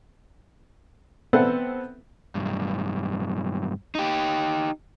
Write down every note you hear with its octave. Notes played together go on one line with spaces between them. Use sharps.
B3 C4 A4 C5 E5 F#5
B1 G2
D#4 G4